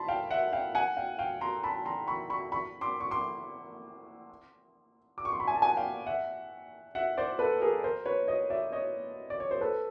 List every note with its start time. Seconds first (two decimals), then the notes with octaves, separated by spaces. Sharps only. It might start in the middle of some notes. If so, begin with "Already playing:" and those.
Already playing: A5 B5 C6
0.08 F5 G5
0.31 E5 F#5
0.52 F5 G5
0.75 F#5 G#5
0.97 F5 G5
1.19 F5 G5
1.41 A#5 C6
1.63 A5 B5
1.85 A#5 C6
2.07 B5 C#6
2.30 B5 C#6
2.52 B5 C#6
2.81 C6 D6
3.01 C#6
3.11 C6 D6
5.18 D6
5.25 C#6
5.32 C6
5.40 B5 C#6
5.47 G#5
5.55 A5
5.62 F#5 G#5
5.77 F5 G5
6.06 E5 F#5
6.95 E5 F#5
7.18 C5 D5
7.39 A4 B4
7.61 G#4 A#4
7.84 A#4 C5
8.06 B4 C#5
8.28 C#5 D#5
8.50 D5 E5
8.72 C#5 D#5
9.30 D5
9.40 C#5
9.51 C5
9.61 A4 B4